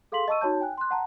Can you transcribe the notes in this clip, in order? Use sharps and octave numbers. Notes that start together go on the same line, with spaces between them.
G#4 A4 F5 C6 B6 F#7
D#5 A5 C#6 E6 D#7
D#4 F#4 C#5 A5 G6
G5 G#5 F#6
C6 F#6
F#5 A5 A#5